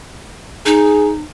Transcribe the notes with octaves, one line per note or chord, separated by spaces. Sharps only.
D#4 G#4